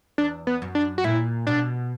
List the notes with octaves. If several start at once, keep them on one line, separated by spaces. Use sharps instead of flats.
E2 D4
B3
F#2
D4
F#4
A#2 E4
B2 D4